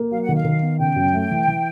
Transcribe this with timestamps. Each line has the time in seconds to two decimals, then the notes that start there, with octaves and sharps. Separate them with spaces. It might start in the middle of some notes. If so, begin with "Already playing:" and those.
Already playing: A#3
0.10 F#3 F5
0.22 F#5
0.29 D#3
0.35 F5
0.45 D#3
0.62 B3
0.79 C#3 G5
0.96 F#2
1.14 A3
1.31 E3
1.48 E3